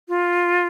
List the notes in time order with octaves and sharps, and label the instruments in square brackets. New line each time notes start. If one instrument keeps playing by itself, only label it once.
[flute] F4